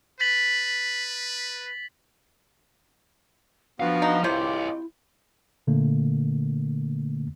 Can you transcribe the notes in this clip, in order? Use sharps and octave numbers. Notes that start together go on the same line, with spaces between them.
B4 A6 B6 F#7
F3 B3 D4 F#4 F5
D#4
C3 E4 F4 G4 C5 C#5 D#5
A#2 D3 A3 A#3